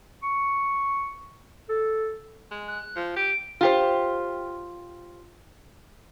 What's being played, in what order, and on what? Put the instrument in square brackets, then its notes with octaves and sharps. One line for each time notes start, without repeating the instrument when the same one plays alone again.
[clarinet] C#6
A4
[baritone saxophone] G#3
[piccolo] F#6
[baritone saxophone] F3
[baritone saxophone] G4 [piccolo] D7
[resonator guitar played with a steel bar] F4 G4 C5